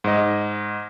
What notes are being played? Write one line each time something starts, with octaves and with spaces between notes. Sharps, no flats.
G#2 D#5